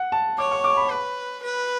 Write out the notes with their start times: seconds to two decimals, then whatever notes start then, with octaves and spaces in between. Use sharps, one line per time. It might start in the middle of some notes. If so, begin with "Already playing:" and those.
Already playing: F#5
0.12 A5
0.38 C#5 D6
0.51 C#6
0.64 D6
0.77 B5
0.90 B4
1.43 B4